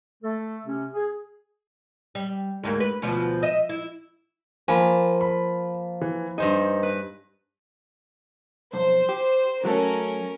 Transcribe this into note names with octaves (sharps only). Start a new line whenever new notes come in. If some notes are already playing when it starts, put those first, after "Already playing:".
A3 A4
C3 C#4
G#4
G3
D2 G#2 A#3
B4
D2 B2 F3
D#5 E5
E4
F3 A#3 G#5 B5
B5
E3
G2 D#4 C5 G#5
B4
B1 F2 C5
G4
F#3 A3 C#4 A4 A#4